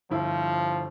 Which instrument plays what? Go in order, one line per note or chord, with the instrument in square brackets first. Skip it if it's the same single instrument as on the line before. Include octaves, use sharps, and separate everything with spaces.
[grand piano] G1 E4 [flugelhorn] F3